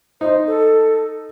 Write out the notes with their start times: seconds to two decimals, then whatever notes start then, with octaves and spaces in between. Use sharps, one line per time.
0.21 D#4 C5
0.47 A4